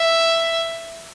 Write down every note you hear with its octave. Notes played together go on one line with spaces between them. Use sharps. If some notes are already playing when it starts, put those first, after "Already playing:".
Already playing: E5